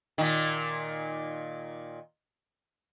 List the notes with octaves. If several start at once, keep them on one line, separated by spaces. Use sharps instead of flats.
A#2 D#3